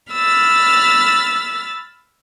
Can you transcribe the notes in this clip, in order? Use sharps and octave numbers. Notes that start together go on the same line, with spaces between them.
B5 E6 F6 A6